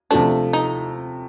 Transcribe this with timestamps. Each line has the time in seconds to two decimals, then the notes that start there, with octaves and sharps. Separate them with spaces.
0.11 C3 F3 A3 D4
0.53 D#4